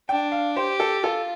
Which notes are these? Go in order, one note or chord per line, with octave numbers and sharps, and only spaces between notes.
D4 G5
F5
G4 C5
A4
F4 A4